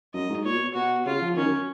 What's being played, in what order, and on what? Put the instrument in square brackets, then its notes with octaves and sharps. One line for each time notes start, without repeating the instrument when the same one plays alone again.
[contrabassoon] F#2 [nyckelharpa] D#5
[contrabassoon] G#2
[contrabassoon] A#2 [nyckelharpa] C#5
[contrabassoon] B2
[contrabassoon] B2 [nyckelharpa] F#4
[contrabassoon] C#3 [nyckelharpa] F4
[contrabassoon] F3
[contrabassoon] D#3 [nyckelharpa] C#4
[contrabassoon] F#2